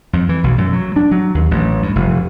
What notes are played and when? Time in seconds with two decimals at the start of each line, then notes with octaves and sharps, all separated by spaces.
0.13 F2
0.29 E3
0.44 B1
0.58 F#2
0.73 F#3
0.96 D4
1.11 F#3
1.35 D#2
1.51 A1
1.83 G2
1.95 F1